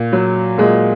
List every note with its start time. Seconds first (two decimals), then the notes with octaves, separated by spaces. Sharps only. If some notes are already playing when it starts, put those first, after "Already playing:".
Already playing: A#2
0.12 F#3
0.58 A#2 G#3